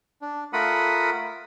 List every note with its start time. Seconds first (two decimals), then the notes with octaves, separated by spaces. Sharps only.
0.21 D4
0.53 A3 F4 A#4 F#5 B5 D#6